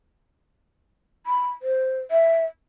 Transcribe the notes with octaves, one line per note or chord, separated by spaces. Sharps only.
B5
C5
E5